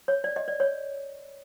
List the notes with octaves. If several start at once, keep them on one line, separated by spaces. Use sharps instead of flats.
C#5
D5
D#5
D5
C#5